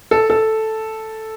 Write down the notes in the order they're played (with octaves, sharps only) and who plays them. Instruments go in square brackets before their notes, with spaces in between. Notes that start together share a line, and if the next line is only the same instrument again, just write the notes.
[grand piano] A4
A4